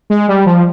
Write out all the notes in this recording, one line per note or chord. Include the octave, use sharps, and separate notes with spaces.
G#3
G3
F3